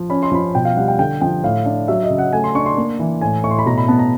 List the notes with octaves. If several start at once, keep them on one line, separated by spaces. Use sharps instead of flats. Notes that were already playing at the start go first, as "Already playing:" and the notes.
Already playing: F3
C#4 B5
C6
F3 B5
B2 G5
F5
G3 F#5
G5
D3 G5
F3 G5
A2 F5
D4
F#3 E5
D#5
C#3
F#5
A3 G#5
C6
D4 C#6
C6
A#3
E3
A2 G#5
A2 C#6
C6
B5
B2 A#5
B5
B3 A5
A#5